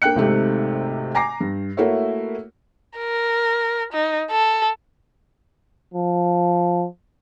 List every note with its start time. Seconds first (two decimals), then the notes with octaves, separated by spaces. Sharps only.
0.02 A#3 D4 G5 F#6 C#7
0.16 G#1 G#2 C3 A3 G4
1.15 G#5 A#5 D6 A#6 C7
1.41 G2
1.77 A3 A#3 E4 F#4 C#5 E5
2.98 A#4
3.93 D#4
4.31 A4
5.94 F3